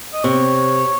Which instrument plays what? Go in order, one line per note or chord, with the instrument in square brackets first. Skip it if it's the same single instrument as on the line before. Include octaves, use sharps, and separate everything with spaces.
[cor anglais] D#5
[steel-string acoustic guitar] C3 [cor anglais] C#5